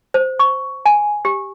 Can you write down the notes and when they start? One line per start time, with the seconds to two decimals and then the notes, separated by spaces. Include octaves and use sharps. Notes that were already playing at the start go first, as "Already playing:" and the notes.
0.14 C5
0.39 C#6
0.86 G#5
1.25 G4